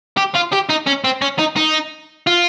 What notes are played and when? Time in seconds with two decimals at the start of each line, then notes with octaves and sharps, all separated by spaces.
0.17 G4
0.35 F4
0.52 G4
0.69 D#4
0.86 C#4
1.04 C4
1.22 C#4
1.39 D#4
1.56 D#4
2.27 F4